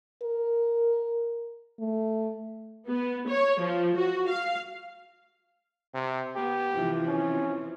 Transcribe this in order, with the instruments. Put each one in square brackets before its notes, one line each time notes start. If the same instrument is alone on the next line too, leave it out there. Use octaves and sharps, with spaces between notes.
[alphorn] A#4
A3
[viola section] B3
C#5
F3
F#4
F5
[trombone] C3
[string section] B3 [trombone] G4
[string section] C3 E3 F3
[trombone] C#4